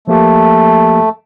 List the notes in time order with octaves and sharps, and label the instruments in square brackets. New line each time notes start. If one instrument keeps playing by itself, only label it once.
[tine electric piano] F3 A#3 G4 [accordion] A3